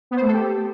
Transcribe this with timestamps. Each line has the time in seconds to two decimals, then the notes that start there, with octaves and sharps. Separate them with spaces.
0.11 B3
0.16 C5
0.22 A3
0.27 A4
0.33 G4